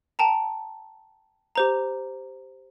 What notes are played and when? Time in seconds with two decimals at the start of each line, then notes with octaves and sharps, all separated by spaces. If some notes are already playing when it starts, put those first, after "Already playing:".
0.19 G5 A5 A#5
1.55 G4 C5 A#5